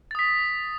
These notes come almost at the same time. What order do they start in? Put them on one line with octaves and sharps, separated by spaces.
A6 D#6 B6